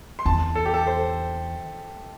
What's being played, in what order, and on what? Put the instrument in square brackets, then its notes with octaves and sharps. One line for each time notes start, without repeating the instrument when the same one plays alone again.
[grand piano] C6
[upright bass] E2 [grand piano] A5
[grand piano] A4
G4
A4
C5